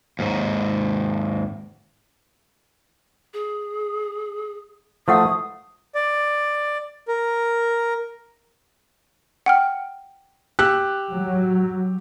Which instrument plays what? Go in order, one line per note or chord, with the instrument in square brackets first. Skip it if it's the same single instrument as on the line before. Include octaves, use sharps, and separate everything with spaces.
[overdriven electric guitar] D#2 G#2
[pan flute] G#4
[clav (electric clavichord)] F3 A3 A#3 [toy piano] E4 E5 F#5 [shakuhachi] D#6
[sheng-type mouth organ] D5
A#4
[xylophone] F#5 G5 F6
[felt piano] G4 E6 F#6
[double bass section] F#3